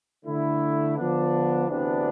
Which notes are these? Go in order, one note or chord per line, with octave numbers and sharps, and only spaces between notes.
D3 A3 E4
D3 F3 B3 D4
D2 C3 E3 B3 D4